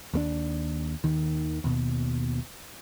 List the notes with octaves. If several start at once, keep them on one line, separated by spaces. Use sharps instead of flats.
D#2 A3 D4
D#2 D#3
D#2 B2